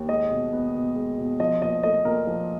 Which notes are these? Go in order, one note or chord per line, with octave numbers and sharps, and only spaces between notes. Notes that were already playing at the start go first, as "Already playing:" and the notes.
Already playing: D#2
G#3 D#5
B2
B3
B2
G#3
B2
F3 D#5
A#2 D#5
A3 D#5
A#2 A#4
F3